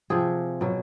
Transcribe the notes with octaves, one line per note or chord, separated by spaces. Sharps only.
C3 F3 G#4
B2 F#3